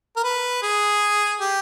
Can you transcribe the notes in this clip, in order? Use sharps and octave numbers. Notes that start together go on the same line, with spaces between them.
A#4
B4
G#4
G4